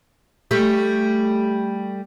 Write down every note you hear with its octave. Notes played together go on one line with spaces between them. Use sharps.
G3 A3 G4